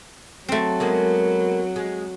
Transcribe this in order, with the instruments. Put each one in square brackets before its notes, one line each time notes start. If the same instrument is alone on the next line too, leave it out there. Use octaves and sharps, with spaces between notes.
[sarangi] F#3 [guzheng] A3 C4
[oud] G#3 A#3 B3
G#3